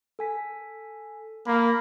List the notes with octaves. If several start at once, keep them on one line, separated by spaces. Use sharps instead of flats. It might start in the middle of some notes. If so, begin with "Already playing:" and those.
A4 G#5 B6
A#3 B5